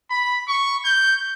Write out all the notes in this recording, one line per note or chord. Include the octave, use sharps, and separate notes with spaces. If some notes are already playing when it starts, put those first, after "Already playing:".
B5
C#6
G6